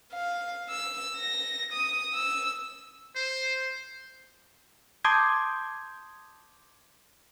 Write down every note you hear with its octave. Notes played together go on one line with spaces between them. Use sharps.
F5
E6
A#6
D#6
E6
C5
A5 C6 D6 D#6 G6 G#6